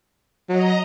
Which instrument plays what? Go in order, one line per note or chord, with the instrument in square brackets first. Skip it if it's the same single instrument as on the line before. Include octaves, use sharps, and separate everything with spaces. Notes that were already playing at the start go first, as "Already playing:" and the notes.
[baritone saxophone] F#3 [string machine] D#5 A#5